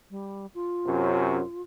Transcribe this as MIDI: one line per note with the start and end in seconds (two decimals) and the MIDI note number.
0.10 0.46 55
0.54 1.62 65
0.85 1.39 42
0.85 1.39 48
0.85 1.39 61